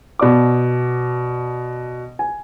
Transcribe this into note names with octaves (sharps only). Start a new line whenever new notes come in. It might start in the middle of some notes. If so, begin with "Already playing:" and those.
B2 D5 D6
G#5